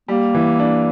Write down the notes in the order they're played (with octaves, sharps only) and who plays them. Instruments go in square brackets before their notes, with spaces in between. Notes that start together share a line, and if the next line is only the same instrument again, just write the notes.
[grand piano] G3 [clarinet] A#3
[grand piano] E3
D4